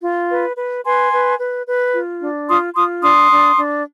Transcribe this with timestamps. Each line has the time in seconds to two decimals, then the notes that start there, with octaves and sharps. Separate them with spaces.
0.02 F4
0.30 B4
0.57 B4
0.85 B4 G#5 C6
1.12 B4
1.39 B4
1.67 B4
1.94 F4
2.21 D4
2.48 F4 C6 D#6
2.75 F4 C6 D#6
3.02 D4 C6 D#6
3.30 D4
3.57 D4